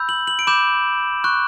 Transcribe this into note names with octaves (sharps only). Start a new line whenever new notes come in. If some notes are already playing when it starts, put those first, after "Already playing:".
Already playing: B5 E6 G6
F#7
F#7
D7
B5 D6 G6 E7
C#6 F#6